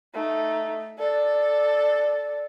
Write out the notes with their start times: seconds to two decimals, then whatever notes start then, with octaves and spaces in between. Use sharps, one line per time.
0.14 A3 D#4
0.99 A4 D5